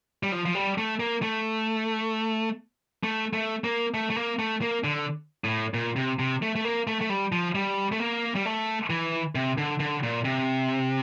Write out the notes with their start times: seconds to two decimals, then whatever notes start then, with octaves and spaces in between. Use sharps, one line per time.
0.23 G3
0.32 F3
0.46 F3
0.55 G3
0.78 A3
1.00 A#3
1.22 A3
3.03 A3
3.33 A3
3.64 A#3
3.94 A3
4.10 A3
4.16 A#3
4.39 A3
4.62 A#3
4.84 D3
5.44 A2
5.74 A#2
5.96 C3
6.19 C3
6.42 A3
6.55 A3
6.65 A#3
6.87 A3
7.01 A3
7.09 G3
7.32 F3
7.55 G3
7.92 A3
8.00 A#3
8.35 G3
8.45 A3
8.90 E3
9.35 C3
9.58 D3
9.80 D3
10.03 A#2
10.25 C3